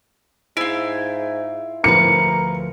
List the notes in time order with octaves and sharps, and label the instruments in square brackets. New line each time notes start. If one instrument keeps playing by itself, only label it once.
[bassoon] G#2 [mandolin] E4 F4
[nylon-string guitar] D2 F3 B4 [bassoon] A#4 [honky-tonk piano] C#7